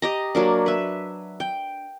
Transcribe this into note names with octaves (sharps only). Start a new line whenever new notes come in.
G4 D#5 A#5
F#3 A#3 D4
B4 E5
G5